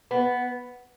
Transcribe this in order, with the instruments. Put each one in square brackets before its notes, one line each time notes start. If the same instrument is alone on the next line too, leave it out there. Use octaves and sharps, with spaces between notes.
[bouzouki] B3